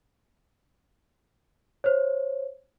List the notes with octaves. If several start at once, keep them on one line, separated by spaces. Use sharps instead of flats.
C5 C#5